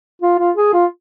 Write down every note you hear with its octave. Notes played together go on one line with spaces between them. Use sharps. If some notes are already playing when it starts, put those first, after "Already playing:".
F4
F4
G#4
F4